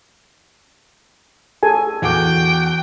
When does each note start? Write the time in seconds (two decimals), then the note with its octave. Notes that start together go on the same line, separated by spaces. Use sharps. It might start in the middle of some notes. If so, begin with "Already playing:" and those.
1.63 G#4 A4 G#5
2.02 E2 F#4 G5 D6